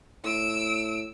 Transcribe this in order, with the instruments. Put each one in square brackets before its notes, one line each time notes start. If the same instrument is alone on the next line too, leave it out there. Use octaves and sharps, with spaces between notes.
[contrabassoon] A2 [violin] E6 D7